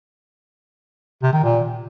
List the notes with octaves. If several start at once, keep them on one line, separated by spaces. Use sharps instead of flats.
C3
D#3
A#2